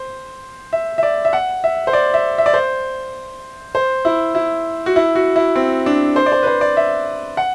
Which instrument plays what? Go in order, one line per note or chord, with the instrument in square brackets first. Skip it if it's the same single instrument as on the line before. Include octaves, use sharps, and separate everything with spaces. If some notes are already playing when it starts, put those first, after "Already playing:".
Already playing: [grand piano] C5
E5
E5
D5
E5
F#5
E5
C5
D5
E5
E5
D5
C5
C5
E4
E4
F#4
E4
F#4
E4
C4
D4
C5
D5
C5
B4
C5
D5
E5
F#5